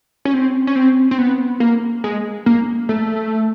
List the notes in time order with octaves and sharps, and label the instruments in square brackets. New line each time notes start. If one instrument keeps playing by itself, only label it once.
[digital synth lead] C#4
C4
C#4
C4
C4
B3
A#3
G#3
A#3
A3